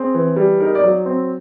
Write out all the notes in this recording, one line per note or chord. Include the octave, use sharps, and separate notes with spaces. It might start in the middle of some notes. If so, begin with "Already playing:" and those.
Already playing: C4 G#4
E3
G3
D#4 A#4
D5
F#3
C4